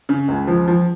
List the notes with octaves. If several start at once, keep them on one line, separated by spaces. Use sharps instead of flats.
C#3
C#2
F3
F3